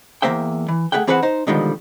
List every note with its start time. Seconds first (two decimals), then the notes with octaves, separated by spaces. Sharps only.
0.22 E2 G#3 A#3 C5 E5 G5
0.68 E3
0.92 A3 A#3 G#4 E5 F#5 G5
1.07 E3 C4 G#4 B4 C5 F#5
1.22 D#4 C5
1.47 B2 D3 D#3 F3 G3 G#3